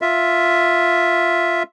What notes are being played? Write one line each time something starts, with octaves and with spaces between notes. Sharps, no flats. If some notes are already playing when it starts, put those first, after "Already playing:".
F4 E5